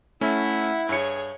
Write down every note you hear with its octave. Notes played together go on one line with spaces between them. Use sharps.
A3 C#4 E4 E5 F#5
G2 G#4 C#5 C#7